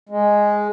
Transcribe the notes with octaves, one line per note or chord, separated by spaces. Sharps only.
G#3